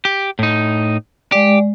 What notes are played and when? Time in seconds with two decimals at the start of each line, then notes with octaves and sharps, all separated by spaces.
0.05 G4
0.39 A2 D#4
1.32 G#3 G4 D5